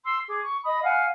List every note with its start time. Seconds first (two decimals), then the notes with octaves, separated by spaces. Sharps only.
0.05 C6 E6
0.27 G#4 D6
0.42 C#6
0.65 D#5 B5 D#6
0.83 F5 F#5 G#5 F6